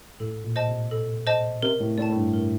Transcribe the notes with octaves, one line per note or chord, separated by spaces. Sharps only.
A2 A4
A#2
C5 D#5 A5
C3
A4
C5 D#5 A5
C3 A#4
A2
A2 D5 A5
A2
G2
A#4